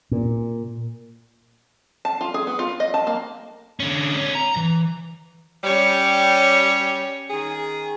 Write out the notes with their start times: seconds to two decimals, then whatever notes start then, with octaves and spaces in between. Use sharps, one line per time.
0.11 A#2
2.05 A5
2.21 F4
2.34 G#4
2.47 B3
2.59 F4
2.80 D#5
2.94 A5
3.07 A#3
3.80 D3 C#4
4.16 C4 C#5
4.35 A#5
4.57 E3
5.64 G3 C#4 C#5
7.30 D#3 G#4